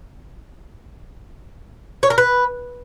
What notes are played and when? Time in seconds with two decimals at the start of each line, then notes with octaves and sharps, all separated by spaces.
2.03 C#5
2.10 A#4
2.18 B4